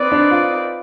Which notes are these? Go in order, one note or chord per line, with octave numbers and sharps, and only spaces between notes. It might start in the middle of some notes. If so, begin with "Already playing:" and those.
Already playing: C4 D#4 B4 D5
D4
F4